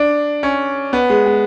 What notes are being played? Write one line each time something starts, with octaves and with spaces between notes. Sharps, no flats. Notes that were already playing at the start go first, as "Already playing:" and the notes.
Already playing: D4
C#4
B3
G#3
G#3